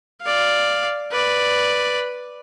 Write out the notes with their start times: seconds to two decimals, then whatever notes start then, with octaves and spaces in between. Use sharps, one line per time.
0.22 D5 F5
1.12 B4 D5